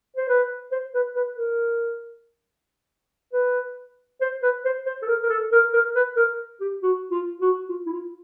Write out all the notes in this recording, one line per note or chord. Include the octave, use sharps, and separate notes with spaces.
C5
B4
C5
B4
B4
A#4
B4
C5
B4
C5
C5
A4
A#4
A#4
A4
A#4
A#4
B4
A#4
G4
F#4
F4
F#4
F4
E4
F4